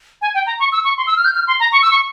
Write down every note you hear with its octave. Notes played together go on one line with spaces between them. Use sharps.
G#5
G5
A#5
C#6
E6
C#6
C6
E6
F6
G6
F6
C6
A#5
C#6
E6
C#6